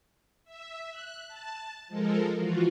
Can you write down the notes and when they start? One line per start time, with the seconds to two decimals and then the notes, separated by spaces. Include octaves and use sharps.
0.44 E5
0.90 F#6
1.27 A5
1.88 F3 G#3 A4 A#4
2.35 E3 F3 F4 F#4